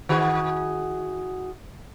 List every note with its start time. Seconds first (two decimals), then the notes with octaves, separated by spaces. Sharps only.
0.09 D#3 F#4 G#4